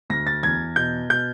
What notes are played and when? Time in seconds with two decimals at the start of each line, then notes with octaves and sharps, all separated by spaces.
0.10 D2 A#6
0.27 A6
0.43 E2 G#6
0.76 B2 G6
1.10 B2 G6